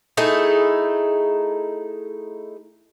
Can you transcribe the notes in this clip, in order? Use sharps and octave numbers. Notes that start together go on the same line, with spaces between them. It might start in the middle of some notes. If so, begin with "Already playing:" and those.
A3 D#4 E4 G#4